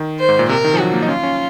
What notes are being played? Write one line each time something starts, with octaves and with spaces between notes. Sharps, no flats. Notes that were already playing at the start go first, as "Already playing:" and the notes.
Already playing: D#3
C5
G#2
A#2
C3 A#4
D#3
F3
F#3 F#4
A#3
D#4
C#4 F4
C#4